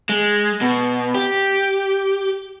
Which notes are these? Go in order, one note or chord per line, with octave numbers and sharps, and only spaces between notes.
G#3
B2
G4